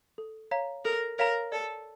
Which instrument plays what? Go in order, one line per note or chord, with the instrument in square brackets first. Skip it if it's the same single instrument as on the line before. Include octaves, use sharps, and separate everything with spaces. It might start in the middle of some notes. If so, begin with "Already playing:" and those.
[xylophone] A4
C#5 F5 A#5
[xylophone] A4 [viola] A#4
[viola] A#4 [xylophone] C#5 F5 A#5
[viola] A4 [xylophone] D5